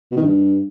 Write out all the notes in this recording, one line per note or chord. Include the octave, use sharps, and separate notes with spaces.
B2
D#3
G2